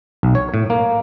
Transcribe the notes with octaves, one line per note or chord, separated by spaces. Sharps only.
B1
C#5
A2
A#3